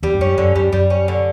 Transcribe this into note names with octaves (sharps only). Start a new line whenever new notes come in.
E2 G3
G2
F#2 C#4
F#2 D3
F#2 G3
F#2 G3
C#4
D3